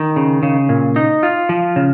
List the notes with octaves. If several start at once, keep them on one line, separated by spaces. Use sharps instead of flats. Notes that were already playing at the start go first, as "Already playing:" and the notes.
Already playing: D#3
C#3
C#3
A#2
D#4
F4
F3
C#3